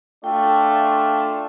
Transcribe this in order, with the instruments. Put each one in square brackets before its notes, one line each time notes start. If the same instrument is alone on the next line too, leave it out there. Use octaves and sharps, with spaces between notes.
[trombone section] A3 D4 F4 [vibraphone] G5